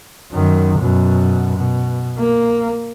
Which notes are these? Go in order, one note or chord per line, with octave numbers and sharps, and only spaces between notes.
F#2 D#3
F#2 B2
B2
A#3